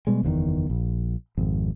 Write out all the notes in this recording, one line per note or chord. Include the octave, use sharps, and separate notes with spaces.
B2 G3 G#3
F#1 E2 B2 D#3
A#1
G#1 F2